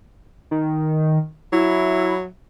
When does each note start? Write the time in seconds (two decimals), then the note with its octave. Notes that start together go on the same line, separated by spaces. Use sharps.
0.51 D#3
1.52 F#3 E4